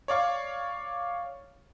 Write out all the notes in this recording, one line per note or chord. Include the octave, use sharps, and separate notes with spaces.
C#5 D5 F5 C#6